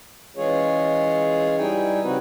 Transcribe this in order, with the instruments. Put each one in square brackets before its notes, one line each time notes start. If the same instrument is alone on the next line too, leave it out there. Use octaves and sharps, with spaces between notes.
[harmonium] E3 G#3 C#4 F4 G#4 C#5
G3 D#4 E4 G5 G#5
C#3 F3 C4 D#4 F#4 B4